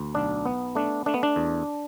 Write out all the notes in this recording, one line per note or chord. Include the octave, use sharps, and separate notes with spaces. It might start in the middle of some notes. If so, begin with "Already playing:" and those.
Already playing: D2
B1 D4
B3
A3 D4
A3 D4
B3
D4
E2